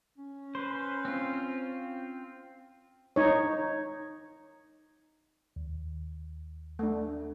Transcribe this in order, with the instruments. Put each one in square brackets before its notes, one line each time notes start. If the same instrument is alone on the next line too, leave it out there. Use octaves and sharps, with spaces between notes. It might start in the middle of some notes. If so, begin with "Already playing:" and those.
[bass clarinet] C#4
[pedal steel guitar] B4 C5
C4 F4
[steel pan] D#4 C#5
[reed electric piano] D#2
[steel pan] A3 D4